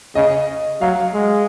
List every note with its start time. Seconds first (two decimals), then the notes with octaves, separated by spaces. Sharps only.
0.15 C#3 D#5
0.81 F#3 F5
1.14 G#3